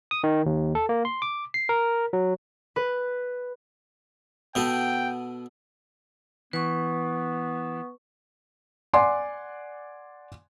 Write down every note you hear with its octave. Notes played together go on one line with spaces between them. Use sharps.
D#6
D#3
D#2
A4
A#3
C6
D6
C7
A#4
F#3
B4
B2 B3 A4 G5
E3 B3 B4 C#6
D5 F#5 G#5 C6 D6